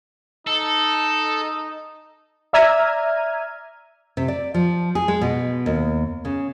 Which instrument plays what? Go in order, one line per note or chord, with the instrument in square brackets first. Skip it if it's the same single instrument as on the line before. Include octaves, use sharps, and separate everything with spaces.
[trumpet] D#4 [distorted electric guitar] A4
[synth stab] D5 E5 A#5 F6 G#6 D#7
[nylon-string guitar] C3
D5
F3
G#4
G#3
B2
D#2
C#3